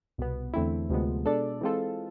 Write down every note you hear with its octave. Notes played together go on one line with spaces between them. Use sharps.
C2 B2 B3
E2 D3 A3 C4 E4
D2 C3 F3 G#3 B3
B2 G#3 D4 A4 D5
E3 G#3 C4 F4 A4